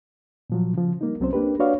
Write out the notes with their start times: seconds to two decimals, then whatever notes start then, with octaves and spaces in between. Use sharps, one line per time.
0.50 A#2 F3 F#3
0.74 C#3 F3
1.01 G3 A#3 D#4
1.20 C2 F#3 C4 C#4 C5
1.33 A#3 D4 G4 B4
1.60 D4 F#4 B4 C#5 D5 F5